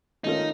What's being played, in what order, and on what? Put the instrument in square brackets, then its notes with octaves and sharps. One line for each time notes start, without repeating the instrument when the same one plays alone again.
[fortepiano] D#3 A3 C#4 F4 A#4 [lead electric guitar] D#4